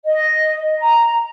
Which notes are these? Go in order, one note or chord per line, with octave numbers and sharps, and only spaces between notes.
D#5
A#5